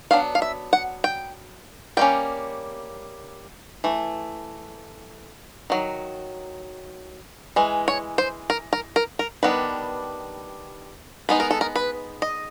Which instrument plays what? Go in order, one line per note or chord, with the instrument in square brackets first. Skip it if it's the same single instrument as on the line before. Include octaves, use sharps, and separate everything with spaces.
[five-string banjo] F#3 B3 D4 F5
F5
E5
F#5
G5
G3 A#3 C#4 G5
E3 A3
D#3 F#3
E3 G#3
C#5
C5
A#4
A#4
A#4
A#4
D#3 G3 B3 D4 B4
G#3 B3 D#4 B4
A#4
A4
A#4
B4
D#5